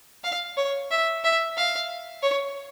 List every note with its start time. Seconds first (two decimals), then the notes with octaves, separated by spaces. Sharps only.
0.24 F5
0.57 C#5
0.91 E5
1.24 E5
1.57 F5
2.23 C#5